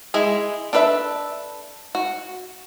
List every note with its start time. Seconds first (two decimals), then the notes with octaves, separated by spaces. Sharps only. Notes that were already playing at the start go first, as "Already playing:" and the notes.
0.14 G#3 E4 G#4
0.73 D4 A4 B4 D5 E5
1.95 F#4